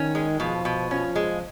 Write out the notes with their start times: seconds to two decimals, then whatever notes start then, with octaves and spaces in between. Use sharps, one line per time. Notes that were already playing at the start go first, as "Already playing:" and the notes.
Already playing: D#3 C#4
0.15 G#3
0.40 B2 F3
0.65 B2
0.90 F3 C#4
1.16 G#3